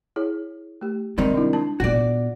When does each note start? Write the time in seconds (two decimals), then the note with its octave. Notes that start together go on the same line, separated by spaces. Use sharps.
0.16 E4 G#4 C#5
0.81 A3 G4
1.18 G2 C3 D#3 G#3
1.34 D4 E4
1.53 D4 A5
1.80 A#2 B3 F#4 D5